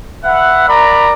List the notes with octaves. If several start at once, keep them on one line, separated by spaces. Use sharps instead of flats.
B4 E5 F#5
A#4 D5 A#5 B5